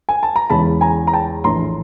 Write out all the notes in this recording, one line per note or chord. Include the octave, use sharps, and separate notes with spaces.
G#5
A5
A#5
E2 C#3 E3 G#3 C#4 A5 B5
G#5 A#5
A#5
G5 A5
A#1 A2 E3 A#5 C6